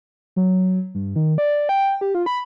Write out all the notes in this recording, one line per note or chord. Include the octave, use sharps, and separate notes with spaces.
F#3
G2
D#3
D5
G5
G4
F4
B5